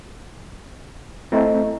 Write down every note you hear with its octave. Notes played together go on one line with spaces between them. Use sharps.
A3 C4 E4 D#5 A#5